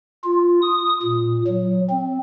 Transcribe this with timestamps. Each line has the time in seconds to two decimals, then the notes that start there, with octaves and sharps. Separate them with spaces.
0.24 F4
0.62 D#6
1.02 A#2
1.47 F#3
1.90 C4